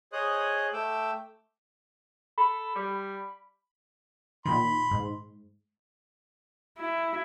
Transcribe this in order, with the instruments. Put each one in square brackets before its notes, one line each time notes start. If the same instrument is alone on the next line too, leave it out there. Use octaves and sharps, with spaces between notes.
[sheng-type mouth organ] G#4 C5 C#5 D#5 D#6 F#6
A3 G5 D6 E6
[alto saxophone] A4 [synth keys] B5
[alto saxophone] G3
[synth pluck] A#2 D#3 [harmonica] B5 C6
[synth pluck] G#2
[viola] E4